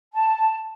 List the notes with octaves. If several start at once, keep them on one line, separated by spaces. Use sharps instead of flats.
A5